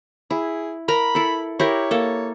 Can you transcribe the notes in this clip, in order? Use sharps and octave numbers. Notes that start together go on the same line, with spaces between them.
E4 G#4
A#4 A#5 B5
E4 A4
E4 G4 A#4 C#5
A#3 A4